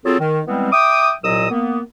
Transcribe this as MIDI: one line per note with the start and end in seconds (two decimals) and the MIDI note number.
0.05 0.18 54
0.05 0.18 60
0.05 0.18 65
0.05 0.18 68
0.05 0.18 69
0.20 0.41 51
0.47 0.68 52
0.47 0.68 55
0.47 0.68 56
0.47 0.68 59
0.47 0.68 60
0.72 1.13 76
0.72 1.13 79
0.72 1.13 86
0.72 1.13 87
1.24 1.47 36
1.24 1.47 46
1.24 1.47 54
1.24 1.47 75
1.24 1.47 87
1.24 1.47 88
1.50 1.81 58
1.50 1.81 59